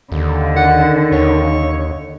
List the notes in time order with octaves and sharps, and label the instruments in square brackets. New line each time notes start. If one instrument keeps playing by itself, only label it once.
[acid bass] D#2 [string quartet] D3
[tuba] D#3 [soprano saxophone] F#5
[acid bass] D#2 [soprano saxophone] C#5